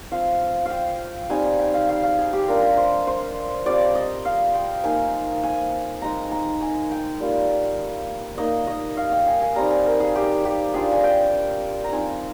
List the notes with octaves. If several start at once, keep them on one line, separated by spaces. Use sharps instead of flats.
F3 C4 F4 F5
F5 G5
G3 C4 D#4 G#5
G#5
G5
F5
F5
F5
G#4
G4
G#3 D4 F4 A#4
C5
C5
G3 C4 F4 D5
D#5
F5
G5
A#3 D#4 G#5
G#5
G#3 D#4 A#5
A#5
G#5
G5
G3 A#3 F4
A#3 D#4 D#5
D#5
F5
G5
G#5
G#5
G3 C4 D#4 A#5
G#5
A#4
G#4
G4
G4
G3 D4 F4 G#4
G#5
G5
A#5
F3 C4 D#4 G#5